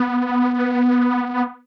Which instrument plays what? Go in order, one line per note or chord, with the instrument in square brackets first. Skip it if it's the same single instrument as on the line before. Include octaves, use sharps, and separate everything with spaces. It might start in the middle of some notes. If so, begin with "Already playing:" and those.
Already playing: [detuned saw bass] B3